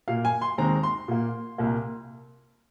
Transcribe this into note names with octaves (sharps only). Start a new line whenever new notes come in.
A#2 A#3 F5
G#5
C6
D#2 D#3 G#3 C4 A#5
C6
A#2 A#3
C2 A#2 A#3